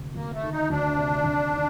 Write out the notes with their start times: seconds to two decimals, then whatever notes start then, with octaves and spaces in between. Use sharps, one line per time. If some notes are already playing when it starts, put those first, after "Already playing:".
Already playing: D2 C3
0.15 D2 A#3
0.33 A3
0.43 D#3
0.52 D#4
0.70 D2 D4
0.97 C3
1.25 D2
1.53 D#3